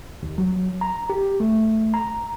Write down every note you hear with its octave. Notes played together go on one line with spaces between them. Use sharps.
D#2
F#3
A#5
G4
A3
A#5